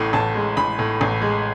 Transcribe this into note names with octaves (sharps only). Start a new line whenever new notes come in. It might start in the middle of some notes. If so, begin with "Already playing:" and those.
Already playing: A1 A2
A1 A5
G#3
A1 B5
A2
A1
G#3